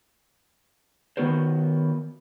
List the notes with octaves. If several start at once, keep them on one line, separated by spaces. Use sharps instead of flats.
D#3 B3 F#4 A#4 C5